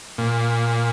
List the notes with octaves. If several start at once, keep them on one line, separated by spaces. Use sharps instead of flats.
A#2